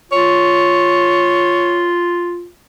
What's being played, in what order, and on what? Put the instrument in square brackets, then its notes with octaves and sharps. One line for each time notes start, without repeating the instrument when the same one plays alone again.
[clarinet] F4 [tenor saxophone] C#5